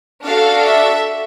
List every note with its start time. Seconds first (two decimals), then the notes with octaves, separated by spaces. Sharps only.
0.24 D4 F#4 A4 F5
0.63 E5